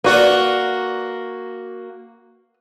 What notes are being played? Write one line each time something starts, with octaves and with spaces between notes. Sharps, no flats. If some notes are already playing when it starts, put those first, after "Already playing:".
A#3 F#4 B4 D5 F#5